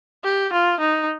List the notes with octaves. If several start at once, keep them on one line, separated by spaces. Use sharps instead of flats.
G4
F4
D#4